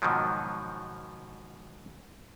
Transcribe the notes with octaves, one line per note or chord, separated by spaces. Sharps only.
G#2 B2 D#3 F3 F#3